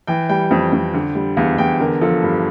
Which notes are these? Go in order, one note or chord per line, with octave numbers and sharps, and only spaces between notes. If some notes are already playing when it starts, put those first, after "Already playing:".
E3 G5
G3 G5
F2
F2
D3
G3
E2 F5
E2 G5
D3 A#4
F3 A4
G2